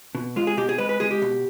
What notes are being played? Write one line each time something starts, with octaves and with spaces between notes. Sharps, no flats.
B2
G#3 F4
G#4
B2 G4
G#4
G#3 B4
B4
G#3 G#4
G4
B2